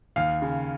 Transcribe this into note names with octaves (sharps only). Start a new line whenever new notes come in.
D#2 F5
C#3